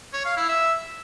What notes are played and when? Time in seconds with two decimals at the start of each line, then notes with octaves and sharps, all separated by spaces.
0.13 C#5
0.25 F5
0.37 E4
0.49 E5